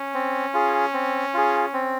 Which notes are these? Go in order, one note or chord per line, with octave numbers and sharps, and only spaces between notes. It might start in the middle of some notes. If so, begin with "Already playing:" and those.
Already playing: C#4
C4
F4 G#4
C4
F4 G#4
C4